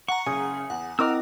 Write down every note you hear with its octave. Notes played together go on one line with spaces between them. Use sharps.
F#5 A#5 C#6
F#1 C#3 G#4 G#5 D#6
E2 F#5
C4 E4 A#4 D#5 A#5 D6 E6 F6